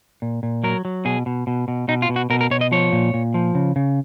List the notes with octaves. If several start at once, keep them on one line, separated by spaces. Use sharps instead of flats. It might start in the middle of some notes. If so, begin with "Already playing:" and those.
A#2
A#2
F#3 A#4
F#3
B2 G#4
B2
B2
B2
B2 D#4
F4
B2
F#4
B2 A#4
A#4
B2 C#5
D#5
F3 C#5
A#2
A#2
F3
C#3
C#3